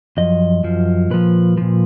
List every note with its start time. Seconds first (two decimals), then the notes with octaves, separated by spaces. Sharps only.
0.17 F#2 F3 D#5
0.64 F#2 F3
1.10 A#2 F3 B4
1.57 A#2 F3